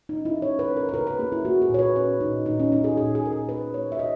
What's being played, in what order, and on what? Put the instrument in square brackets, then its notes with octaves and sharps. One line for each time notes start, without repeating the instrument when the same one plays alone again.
[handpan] D#4
C#4
E4
C#4 C#5
B4
C#4
A#4
B4
C#3 A#4
B4
A#3 G#4
E4
A#3 F#4
G#4
A#2 C#5
B4
C#4 B4
A#2 D#4
A#2 D#4
C#4
G#3 D#4
G#4
A#2 G#4
G#4
A#2 A#4
G#4
A#3 B4
A#3 C#5
E5
B2 D#5